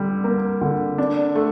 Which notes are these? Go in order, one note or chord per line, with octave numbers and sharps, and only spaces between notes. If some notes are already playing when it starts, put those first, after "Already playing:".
Already playing: D3 G3
A#3
D3
D4
A3